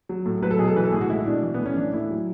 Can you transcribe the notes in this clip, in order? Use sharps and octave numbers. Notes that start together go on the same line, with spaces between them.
F#3
A2
F#3 B4
A4
B2 G#4
A4
E3 B4
A4
A2 G#4
F#4
G#3 E4
B2 D4
E3
B3
A2
C#4
E3 D4
A2 E4
F#3